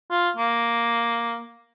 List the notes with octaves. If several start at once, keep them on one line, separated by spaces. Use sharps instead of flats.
F4
A#3